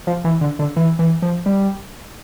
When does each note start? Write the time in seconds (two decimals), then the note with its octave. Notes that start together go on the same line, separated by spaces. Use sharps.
0.07 F3
0.24 E3
0.41 D3
0.59 D3
0.76 E3
0.99 E3
1.22 F3
1.46 G3